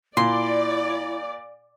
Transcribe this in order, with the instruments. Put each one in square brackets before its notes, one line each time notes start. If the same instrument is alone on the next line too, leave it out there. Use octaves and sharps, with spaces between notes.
[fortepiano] A#2 [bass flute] E4 [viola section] D5 [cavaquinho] C6